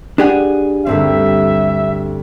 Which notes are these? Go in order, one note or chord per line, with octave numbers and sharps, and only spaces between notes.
D4 G4 G#4 F#5 G#5
D2 G2 C4 E5